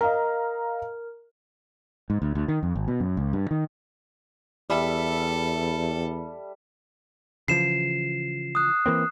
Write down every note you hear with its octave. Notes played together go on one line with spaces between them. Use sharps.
A#4 D#5 F5 A#5
G#2
D2
D2
D#3
F2
G#1
B2
F#2
C#2
G2
D#3
E2 G3 A4 E5
C#3 E3 F3 C7 E7
D#6 F#6
E3 A#3 C4